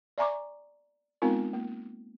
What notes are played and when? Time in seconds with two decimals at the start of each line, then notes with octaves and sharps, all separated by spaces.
0.18 D5 E5 G#5 A#5 C#6 D6
1.22 G#3 B3 C4 D#4 F4 A#4
1.53 A#3